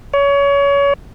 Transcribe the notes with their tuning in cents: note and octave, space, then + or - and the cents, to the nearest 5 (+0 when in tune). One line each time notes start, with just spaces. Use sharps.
C#5 +25